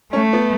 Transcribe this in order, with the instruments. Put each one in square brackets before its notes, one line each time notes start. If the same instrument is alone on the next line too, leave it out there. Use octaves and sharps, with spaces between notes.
[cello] A3 [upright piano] C#4
[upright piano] B3